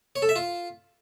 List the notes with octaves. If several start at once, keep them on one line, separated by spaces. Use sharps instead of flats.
C#5
A4
E5
F4